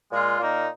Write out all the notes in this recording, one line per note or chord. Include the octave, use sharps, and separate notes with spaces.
A#2 G#3 F4
A#2 A#3 D#4